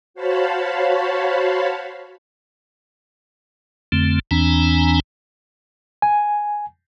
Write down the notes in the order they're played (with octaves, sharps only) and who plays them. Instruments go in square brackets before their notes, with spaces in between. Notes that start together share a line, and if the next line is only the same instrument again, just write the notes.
[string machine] F#4 C5 C#5 F5 A5 B5
[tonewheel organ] F2 D3 A3 C4
E2 E3 C4 D4 G#5 A#5
[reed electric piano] G#5